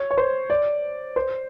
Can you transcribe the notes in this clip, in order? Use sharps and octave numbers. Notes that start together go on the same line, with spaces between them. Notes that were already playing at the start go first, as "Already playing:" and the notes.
Already playing: C#5
C#5
C5
D5
C5